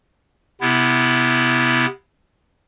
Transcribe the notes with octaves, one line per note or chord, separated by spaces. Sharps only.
C3 B3 E4